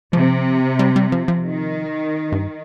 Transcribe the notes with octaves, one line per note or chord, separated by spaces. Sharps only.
C3 F3
G3
G3
F3
F3
D#3
G2